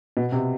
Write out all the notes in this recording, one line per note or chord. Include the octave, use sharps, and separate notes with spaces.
B2
C3